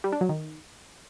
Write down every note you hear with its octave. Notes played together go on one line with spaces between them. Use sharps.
G3
D4
F#3
D#3